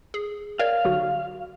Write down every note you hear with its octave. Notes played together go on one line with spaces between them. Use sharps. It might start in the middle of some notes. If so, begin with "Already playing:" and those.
G#4
A#4 C#5 D5 F5
B1 D3 F#4